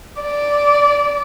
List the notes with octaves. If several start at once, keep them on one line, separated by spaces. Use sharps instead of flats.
D5